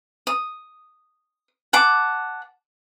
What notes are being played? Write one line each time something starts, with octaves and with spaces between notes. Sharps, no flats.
D#6
F#5 A5 D6